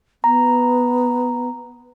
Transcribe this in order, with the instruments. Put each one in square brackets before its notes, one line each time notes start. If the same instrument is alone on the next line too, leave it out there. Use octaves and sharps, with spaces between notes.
[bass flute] B3 [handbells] A#5